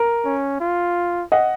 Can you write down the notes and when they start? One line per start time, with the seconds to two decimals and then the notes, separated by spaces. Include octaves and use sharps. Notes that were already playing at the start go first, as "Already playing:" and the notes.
Already playing: A#4
0.25 C#4
0.60 F4
1.32 D#5 F#5